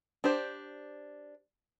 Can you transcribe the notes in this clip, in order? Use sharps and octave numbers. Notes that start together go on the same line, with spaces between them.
D4 G4 C5